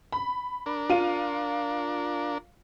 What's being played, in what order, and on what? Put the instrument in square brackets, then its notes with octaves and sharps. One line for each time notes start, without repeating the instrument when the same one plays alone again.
[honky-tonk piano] B5
[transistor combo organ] D4 A#4
[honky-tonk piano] F4 F5 D#7